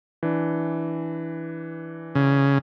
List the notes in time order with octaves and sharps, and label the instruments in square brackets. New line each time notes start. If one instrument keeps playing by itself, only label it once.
[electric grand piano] E3 D4
[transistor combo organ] C#3